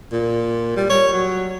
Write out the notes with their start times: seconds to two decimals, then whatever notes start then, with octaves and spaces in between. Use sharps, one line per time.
0.12 A#2
0.77 G3
0.90 C#5
1.13 F#3